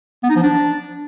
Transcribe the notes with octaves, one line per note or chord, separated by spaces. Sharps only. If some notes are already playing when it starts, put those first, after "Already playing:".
B3
D#4
F3
D4